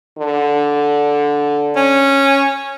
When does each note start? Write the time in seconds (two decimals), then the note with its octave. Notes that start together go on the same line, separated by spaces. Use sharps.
0.18 D3
1.76 C#4